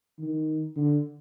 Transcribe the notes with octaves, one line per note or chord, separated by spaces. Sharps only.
D#3
D3